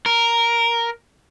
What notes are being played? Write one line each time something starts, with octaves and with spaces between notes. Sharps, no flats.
A#4